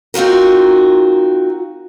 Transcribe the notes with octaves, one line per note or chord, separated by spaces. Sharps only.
C4 D#4 F4 F#4 A#4